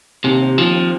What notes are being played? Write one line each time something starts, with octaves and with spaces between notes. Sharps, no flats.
D#2 C3
C4
D#2 F3
C4